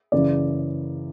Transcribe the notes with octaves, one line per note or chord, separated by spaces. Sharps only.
F#1 F#2 C#3 E3 D5